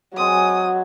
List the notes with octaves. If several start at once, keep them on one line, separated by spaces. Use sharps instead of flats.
F#3 G#3 C4 B4 D#6